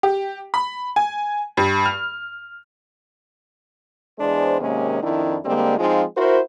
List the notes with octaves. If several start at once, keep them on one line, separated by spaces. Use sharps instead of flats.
G4
B5
G#5
G2
F6
E2 G#3 D4 C5
D#2 C3 G#3 A#3 C#4
F2 D#3 D4 E4
D3 G3 G#3 A#3 C4
F3 G#3 C4 D#4 F4
E4 F#4 A#4 C5